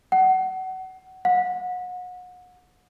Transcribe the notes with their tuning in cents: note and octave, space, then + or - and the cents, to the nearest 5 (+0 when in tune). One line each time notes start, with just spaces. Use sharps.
F#5 +25
F#5 -35